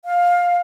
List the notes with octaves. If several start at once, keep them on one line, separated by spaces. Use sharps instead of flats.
F5